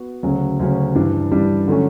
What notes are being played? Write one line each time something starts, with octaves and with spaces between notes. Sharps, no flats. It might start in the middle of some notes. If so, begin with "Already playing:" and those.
Already playing: B3 F#4
D2 C#3 F#3 C#4
D2 C#3 F#3 C#4
G2 E3 G3 D4
G2 E3 G3 D4
D3 F#3 A3 C#4